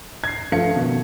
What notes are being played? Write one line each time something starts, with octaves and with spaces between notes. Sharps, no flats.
G#6 C7
G2 F3 A3 F5 C#7
B2 D#3